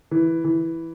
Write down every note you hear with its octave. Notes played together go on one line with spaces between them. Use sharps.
E3
E3